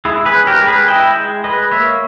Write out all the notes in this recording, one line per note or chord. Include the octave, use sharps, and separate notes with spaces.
G#3 E4 G#4
G#4 B4
C#4
G4 A#4
G#3
G#4 B4
E4 D#5 G5
G#3
G#3 B4 D#5
A#3 C#5 E5